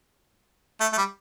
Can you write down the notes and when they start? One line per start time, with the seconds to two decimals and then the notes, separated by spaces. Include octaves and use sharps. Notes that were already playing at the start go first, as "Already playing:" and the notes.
0.81 A3
0.93 A3
0.98 G3